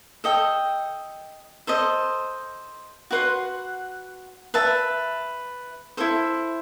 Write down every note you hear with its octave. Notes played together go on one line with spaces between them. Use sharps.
A4 D#5 G5
A4 C5 D#5
F#4 B4 F#5 C6
B4 E5 A5
E4 A4 C5